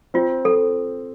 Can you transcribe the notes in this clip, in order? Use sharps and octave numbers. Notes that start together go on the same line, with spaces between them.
C4 F4
C4 A4